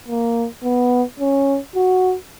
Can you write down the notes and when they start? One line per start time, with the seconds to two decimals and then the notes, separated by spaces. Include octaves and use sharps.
0.09 A#3
0.64 B3
1.20 C#4
1.76 F#4